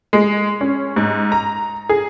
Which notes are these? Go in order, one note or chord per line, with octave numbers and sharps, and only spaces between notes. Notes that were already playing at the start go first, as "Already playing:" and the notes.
G#3
C#4
G#2
A#5
G#4